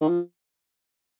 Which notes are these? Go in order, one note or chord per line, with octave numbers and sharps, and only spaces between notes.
D#3
F3